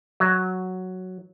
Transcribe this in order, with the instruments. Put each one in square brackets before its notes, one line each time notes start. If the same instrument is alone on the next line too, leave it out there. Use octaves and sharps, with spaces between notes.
[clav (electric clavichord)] F#3